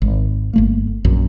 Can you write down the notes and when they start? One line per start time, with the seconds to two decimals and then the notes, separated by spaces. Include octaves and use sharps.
0.02 G#1
0.53 G1 A3 A#3
1.05 A#1 F#2